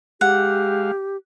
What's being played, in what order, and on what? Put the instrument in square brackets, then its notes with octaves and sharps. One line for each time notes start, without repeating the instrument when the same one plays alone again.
[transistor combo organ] G#3 F5 [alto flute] G4 [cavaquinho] F#5